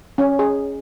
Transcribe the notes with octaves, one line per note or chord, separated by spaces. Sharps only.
C#4
G#4